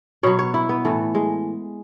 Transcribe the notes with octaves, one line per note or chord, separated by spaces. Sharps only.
B2 F#3 C#5
C#5
E4
B3
A2 E3 A3
G#3